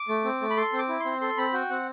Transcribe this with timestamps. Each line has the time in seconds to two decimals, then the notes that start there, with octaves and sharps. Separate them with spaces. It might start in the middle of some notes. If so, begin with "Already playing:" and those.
Already playing: D6
0.09 A3
0.25 C4
0.41 A3
0.50 B5
0.57 A4 C6
0.73 C4
0.78 D6
0.89 E4
1.00 C6
1.05 C4
1.21 A4 C6
1.38 C4 B5
1.53 F#4 G5
1.70 C4 F#5